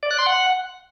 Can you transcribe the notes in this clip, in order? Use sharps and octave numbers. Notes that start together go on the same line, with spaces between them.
D5
F#6
C6
F#5